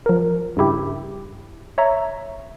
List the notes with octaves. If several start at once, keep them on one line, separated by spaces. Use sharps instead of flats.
F3 A#4
G2 C#3 E4 G4
C#5 E5 A#5